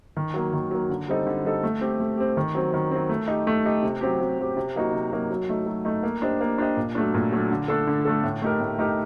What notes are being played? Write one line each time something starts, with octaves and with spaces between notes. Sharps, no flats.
D#3
F#3 A#3
D#3
F#3 A#3
D3
G3 C4 D#4 A4
D3
G3 C4 D#4 A4
A3
C4 G4
A3
C4 G4
D#3
F#3 C4
D#3
F#3 C4
A3
D#4 G4
A3
D#4 G4
C3
F#3 C4 G4
C3
F#3 C4 G4
C3
F#3 A#3 D#4 F#4
C3
F#3 A#3 D#4 F#4
F#3
A3 D#4
F#3
A3 D#4
A#3
D4 G4 C5 D#5
A#3
D4 G4 C5 D#5
A#2
F#3 A3 D4
A#2
F#3 A3 D4
D3
A3 D4 A4
D3
A3 D4 A4
A2
A3 D#4 G4 A#4
A2
A3 D#4 G4 A#4